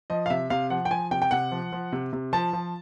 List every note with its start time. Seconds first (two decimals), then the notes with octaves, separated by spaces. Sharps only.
0.10 F3 D#5
0.26 F5
0.30 C3 E5
0.50 C3 F5
0.70 F3 F#5
0.85 G5
0.91 F3 G#5
1.11 C3 G5
1.22 G5
1.31 C3 F#5
1.52 F3
1.72 F3
1.92 C3
2.13 C3
2.33 F3 A5
2.53 F3